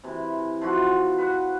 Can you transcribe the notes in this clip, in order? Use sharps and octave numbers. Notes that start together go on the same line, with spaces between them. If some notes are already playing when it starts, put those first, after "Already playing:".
C3 E3
F3 E4 F#4 F#5
B4 F#5